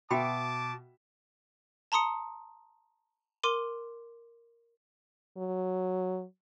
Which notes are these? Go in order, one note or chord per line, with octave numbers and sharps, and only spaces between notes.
B2 F#4 E5 G5 A5 B5 D6
A5 A#5 C6 D#6 C#7
A#4 C6 D6 D#7
F#3